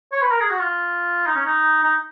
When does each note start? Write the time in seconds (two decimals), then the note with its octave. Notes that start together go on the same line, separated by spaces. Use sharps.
0.12 C#5
0.22 B4
0.31 A#4
0.40 G#4
0.50 F#4
0.59 F4
1.26 D#4
1.35 C#4
1.45 D#4
1.83 D#4